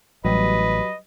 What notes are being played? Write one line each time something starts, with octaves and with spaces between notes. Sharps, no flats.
A1 F#3 G3 B4 D#5